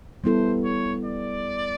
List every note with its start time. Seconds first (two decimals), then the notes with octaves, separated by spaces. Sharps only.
0.24 G3 B3 E4 A4 C5
0.64 C#5
1.05 D5